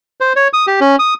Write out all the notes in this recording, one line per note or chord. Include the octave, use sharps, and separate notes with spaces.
C5
C#5
D#6
G4
C#4
D#6